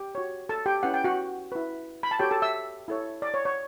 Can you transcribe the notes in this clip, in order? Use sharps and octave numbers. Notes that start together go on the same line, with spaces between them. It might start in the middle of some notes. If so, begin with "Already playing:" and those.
Already playing: G4 G5
F#4 C#5
A4 A5
G4 G5
C#4 E4 B4 F#5
G5
F#4 F#5
E4 B4
B5
A5
F#4 G4 A4 C#5 G5
A4 A5
E5 E6
E4 A4 C#5
D5
C#5
C#5